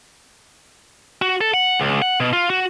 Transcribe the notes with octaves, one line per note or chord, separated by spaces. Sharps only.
F#4
A4
F#5
C#2
F#5
B2
F4
F#4